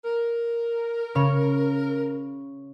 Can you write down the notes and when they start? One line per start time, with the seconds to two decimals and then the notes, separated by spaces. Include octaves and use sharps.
0.04 A#4
1.15 C#3 C#5